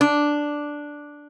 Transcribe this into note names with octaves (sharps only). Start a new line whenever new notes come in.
D4